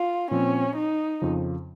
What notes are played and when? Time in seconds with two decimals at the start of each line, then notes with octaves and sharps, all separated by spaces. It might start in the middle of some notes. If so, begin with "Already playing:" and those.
Already playing: F4
0.31 A#2 F3 C4 C#4
0.76 D#4
1.22 F2 C#3 F3